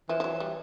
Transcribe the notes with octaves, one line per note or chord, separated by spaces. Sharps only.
E3 F3
F3
F#3
G3